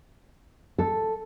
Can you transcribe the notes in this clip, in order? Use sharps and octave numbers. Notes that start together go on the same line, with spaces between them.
A4